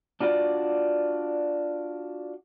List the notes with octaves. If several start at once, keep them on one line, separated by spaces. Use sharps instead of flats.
D4 F4 F#4 A4 D5